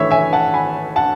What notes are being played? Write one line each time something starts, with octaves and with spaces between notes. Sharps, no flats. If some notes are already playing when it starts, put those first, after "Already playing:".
Already playing: A2 E3 C#5 E5
E5 G#5
F#5 A5
G#5 B5
F#5 A5